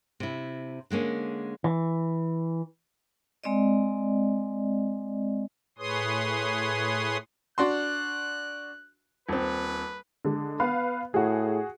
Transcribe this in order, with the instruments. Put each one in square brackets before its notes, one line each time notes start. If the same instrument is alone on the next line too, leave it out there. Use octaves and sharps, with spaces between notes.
[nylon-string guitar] C3 E4
D3 G#3 A#3 C#4
[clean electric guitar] E3
[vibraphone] G#3 C4 D5 D#5
[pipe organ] A2 G#4 B4 C#5 C6 D#6
[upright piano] D4 F#4 C6 [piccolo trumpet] F#6
[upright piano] D#1 C4 [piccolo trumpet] B4
[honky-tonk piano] D3 G#3
B3 B4 F5
[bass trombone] A2 [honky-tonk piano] F#4 G#4